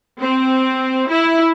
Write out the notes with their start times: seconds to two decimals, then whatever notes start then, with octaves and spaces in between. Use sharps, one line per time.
0.20 C4
1.10 E4